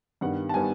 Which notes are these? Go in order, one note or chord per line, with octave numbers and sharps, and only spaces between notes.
G2 D#3 G3 B3 F#5
A5
D#3 G3 B3 G#5